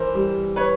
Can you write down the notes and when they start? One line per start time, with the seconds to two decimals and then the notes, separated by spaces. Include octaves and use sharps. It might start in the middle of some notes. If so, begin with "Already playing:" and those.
Already playing: E3 A#4 C5
0.14 G3
0.56 B4 C#5